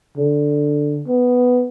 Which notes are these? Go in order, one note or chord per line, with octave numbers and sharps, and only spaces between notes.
D3
B3